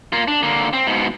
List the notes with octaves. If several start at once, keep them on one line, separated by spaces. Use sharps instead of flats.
A#3 F4
D4
D3 A#3
C4
G#2 B2